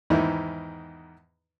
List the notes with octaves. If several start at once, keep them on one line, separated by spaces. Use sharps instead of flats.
E2 G#2 D#3 D#4 E4